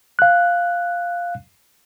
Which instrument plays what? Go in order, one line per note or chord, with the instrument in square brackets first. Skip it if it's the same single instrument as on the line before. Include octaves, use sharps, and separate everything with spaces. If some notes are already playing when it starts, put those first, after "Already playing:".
[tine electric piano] F5 F#6